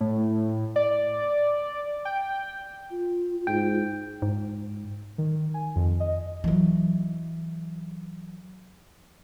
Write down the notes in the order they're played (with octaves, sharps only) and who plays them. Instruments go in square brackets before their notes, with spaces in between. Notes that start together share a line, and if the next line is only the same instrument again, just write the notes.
[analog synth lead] A2
D5
G5
[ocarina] F4
[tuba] G#2 [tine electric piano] G5
[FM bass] G#2
[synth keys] D#3
G#5
F2
D#5
[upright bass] E3 F#3